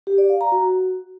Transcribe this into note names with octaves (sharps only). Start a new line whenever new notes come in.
G4
D5
F5
A#5
F#4